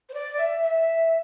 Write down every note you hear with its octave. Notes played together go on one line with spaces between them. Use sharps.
C5
D5
E5
E5